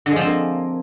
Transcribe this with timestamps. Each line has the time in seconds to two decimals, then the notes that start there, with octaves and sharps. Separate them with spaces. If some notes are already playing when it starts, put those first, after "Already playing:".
0.06 D3
0.11 G#3
0.16 F3
0.21 C4
0.26 A#3